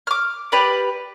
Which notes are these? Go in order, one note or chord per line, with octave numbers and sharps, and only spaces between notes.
D6 F6
G4 B4 D5